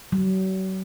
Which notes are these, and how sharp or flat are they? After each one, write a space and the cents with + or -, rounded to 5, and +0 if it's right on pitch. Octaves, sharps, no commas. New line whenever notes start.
F#3 +40